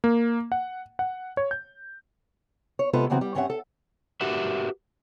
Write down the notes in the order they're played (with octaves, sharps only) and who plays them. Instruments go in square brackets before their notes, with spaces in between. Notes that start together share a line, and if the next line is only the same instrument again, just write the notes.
[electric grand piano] A#3
F#5
F#5
C#5
G6
[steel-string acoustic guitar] C#5
C3 G#3 B3 F4 A4 B4
C#3 E3 F#3 B3 C4 F#4
G3
G2 C4 C#4 C#5 E5 F#5
A4
[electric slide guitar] F#4 G4 A#4 B4 E5 F#5